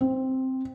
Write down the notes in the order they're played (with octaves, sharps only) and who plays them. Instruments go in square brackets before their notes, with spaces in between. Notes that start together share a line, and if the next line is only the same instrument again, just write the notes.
[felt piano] C4